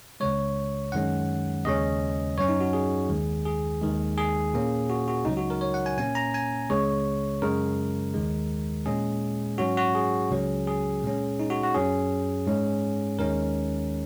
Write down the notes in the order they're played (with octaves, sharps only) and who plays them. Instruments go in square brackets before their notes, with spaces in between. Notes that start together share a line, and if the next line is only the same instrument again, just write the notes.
[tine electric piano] C#2 C#3 G#3 C#5
F#2 D#3 G#3 C#4 F#5
D#2 C#3 G#3 C#4 D#5
F#2 F#3 C#4 C#5
D#4
F#4
G#4
D#2 D#3 G#3
G#4
D#2 D#3 G#3
G#4
A#2 A#3 C#4
F#4
F#4
C#2 C#3 F#3 D#4
F#4
A#4
C#5
F#5
G#5
A#2 A#3 C#4 G#5
A#5
G#5
C#2 C#3 G#3 C#5
F#2 C#3 G#3 A#4
D#2 D#3 G#3
A#2 G#3 C#4 G#4
G#2 F#3 C#4 F#4
F#4
G#4
C#2 C#3 F#3 C#4
G#4
A#2 G#3 C#4
D#4
F#4
F#4
F#2 F#3 C#4 G#4
G#2 G#3 C#4
D#2 D#3 G#3 C#4 A#4